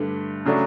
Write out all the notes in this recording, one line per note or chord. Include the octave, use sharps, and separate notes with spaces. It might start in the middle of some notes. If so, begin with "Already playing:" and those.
Already playing: G2 D3 A3
C#3 F#3 A3 D4